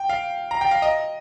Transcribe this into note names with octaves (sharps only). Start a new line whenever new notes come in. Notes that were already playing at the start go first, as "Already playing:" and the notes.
Already playing: G5
F5
A#5
G5
F5
D#5